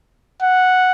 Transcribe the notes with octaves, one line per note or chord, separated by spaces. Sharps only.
F#5